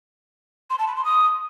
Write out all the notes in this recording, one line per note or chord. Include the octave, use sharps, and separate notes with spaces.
C6
A5
B5
C6
D#6